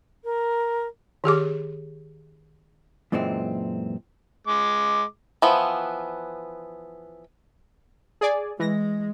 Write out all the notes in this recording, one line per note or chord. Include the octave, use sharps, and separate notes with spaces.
A#4
D#3 G4 G#4 D6
F#2 A#2 E3 G#3 C4
G#3 D6
E3 F3 B3
G#4 D5 G#5
E3 G#3 A#6